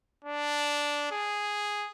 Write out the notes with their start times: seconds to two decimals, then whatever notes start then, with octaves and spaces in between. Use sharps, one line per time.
0.25 D4
1.11 G#4